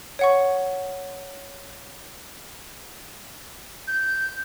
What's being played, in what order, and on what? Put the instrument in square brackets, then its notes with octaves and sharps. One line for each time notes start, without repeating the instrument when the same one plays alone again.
[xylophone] C#5 F#5 C#6
[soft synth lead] G6